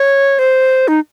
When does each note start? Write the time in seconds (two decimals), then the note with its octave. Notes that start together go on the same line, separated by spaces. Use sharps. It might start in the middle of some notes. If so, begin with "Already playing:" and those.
Already playing: C#5
0.39 C5
0.88 D#4